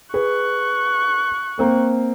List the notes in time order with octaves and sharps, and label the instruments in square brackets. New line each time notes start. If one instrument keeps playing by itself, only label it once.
[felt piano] G#4 B4 [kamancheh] C#6 F#6
[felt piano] A#3 C4 A#4